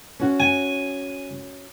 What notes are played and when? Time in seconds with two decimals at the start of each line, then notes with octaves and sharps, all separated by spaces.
0.20 C#4 F#4
0.40 G#5